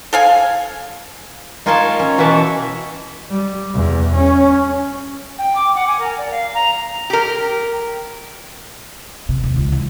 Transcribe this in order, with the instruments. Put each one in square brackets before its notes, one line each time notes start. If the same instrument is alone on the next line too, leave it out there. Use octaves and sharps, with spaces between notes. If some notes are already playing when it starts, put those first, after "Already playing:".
[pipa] A4 F5 G#5
[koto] D#4 F4 A#4 C#5 G#5 A5
C#4
B2 E3 F#4 E5 A5
[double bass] G3
E2
C#4
[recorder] G5
D6
F#5
G#5
A#4
D5
F5
A#5
[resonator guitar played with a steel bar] G4 A#4
[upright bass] C3
D#2
C#2
E3